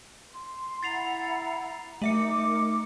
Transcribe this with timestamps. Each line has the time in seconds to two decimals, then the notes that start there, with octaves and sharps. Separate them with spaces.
0.31 C6
0.83 E4 F#5 A#5 A6 C7 F7
2.02 A3 D#4 A#4 E5 D6 C#7